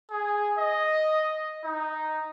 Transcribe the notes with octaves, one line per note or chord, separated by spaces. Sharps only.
G#4
D#5
D#4